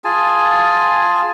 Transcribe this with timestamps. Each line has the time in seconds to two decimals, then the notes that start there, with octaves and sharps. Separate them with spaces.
0.04 F4 G#4 G#5 A5